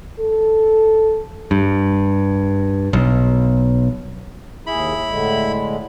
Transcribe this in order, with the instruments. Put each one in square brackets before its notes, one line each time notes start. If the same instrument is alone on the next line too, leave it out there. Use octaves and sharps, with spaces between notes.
[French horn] A4
[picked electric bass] G2
B1
[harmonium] D#2 G#4 [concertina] E4 B5
[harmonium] A2 D3 G#3